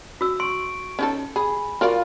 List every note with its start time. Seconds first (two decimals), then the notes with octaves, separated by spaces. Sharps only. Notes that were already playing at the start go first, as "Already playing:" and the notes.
0.21 F#4 E6
0.40 C6 C#6 D7
0.99 C#4 D#4 A4
1.36 G#4 G#5 B5
1.81 F4 F#4 A#4 D5